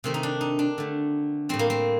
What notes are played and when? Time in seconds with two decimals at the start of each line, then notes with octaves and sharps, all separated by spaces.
0.04 C3 D#3 A3 C4
0.14 D#4
0.23 D4
0.41 D#4
0.59 D4
0.78 D3 A3
1.49 A2 G3 C4
1.59 A#3
1.70 C4